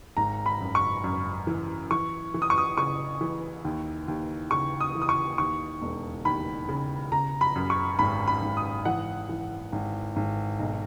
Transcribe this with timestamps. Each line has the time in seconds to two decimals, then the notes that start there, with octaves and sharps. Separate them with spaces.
0.17 G#1 A#5
0.46 B5
0.61 F#2
0.75 C#6
1.04 F#2
1.47 E3
1.91 E3 C#6
2.34 E3
2.42 D#6
2.50 C#6
2.58 D#6
2.77 C#3 C#6
3.21 E3
3.65 D#2
4.08 D#2
4.51 C#3 C#6
4.80 D#6
4.95 E3
5.02 D#6
5.09 C#6
5.38 D#2 C#6
5.82 E1
6.25 D#2 B5
6.69 C#3
7.12 C#3 A#5
7.41 B5
7.55 F#2
7.70 C#6
7.99 G#1 B5
8.28 B5
8.42 G#1
8.57 D#6
8.85 E3 F#5
9.29 E3
9.72 G#1
10.16 G#1
10.59 B1